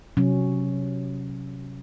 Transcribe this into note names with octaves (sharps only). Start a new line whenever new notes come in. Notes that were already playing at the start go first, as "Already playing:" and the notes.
C3 F#3 C#4